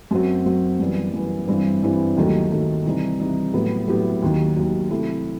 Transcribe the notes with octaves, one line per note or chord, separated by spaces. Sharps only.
F#2 F#3 C4 F#4
F#2 F#3 C4 F#4
F#2 E3 G3 B3
F#2 E3 G3 B3
G2 E3 G3 C4 E4
G2 E3 G3 C4 E4
D#2 D#3 F#3 A3
D#2 D#3 F#3 A3
C3 E3 G3 D#4
C3 E3 G3 D#4
A2 F#3 B3 E4 G4
A2 F#3 B3 E4 G4
D#2 D#3 F#3
D#2 D#3 F#3
C3 F#3 A3 E4